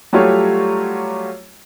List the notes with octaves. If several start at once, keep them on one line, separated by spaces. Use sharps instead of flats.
F#3 G3 A3 F4 G4 C#5